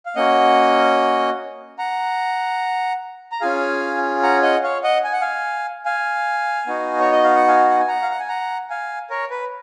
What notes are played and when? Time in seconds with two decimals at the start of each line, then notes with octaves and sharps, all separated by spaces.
0.06 F5
0.16 A#3 C#4 F#4 D#5 F#5
1.79 F#5 A#5
3.32 A#5
3.41 C#4 F4 G#4 F5 G#5
4.23 F#5 A#5
4.42 D#5 F#5
4.63 C#5 F5
4.84 D#5 F#5
5.04 G#5
5.13 F#5
5.21 F5 G#5
5.85 F5 G#5
6.67 B3 D#4 F#4
7.00 C#5
7.12 D#5
7.24 F5
7.36 F#5
7.48 F5 G#5
7.70 F#5
7.80 G#5
7.88 F#5 A#5
8.02 F5
8.11 F#5
8.20 G#5
8.29 F#5 A#5
8.70 F5 G#5
9.10 A#4 C#5
9.30 B4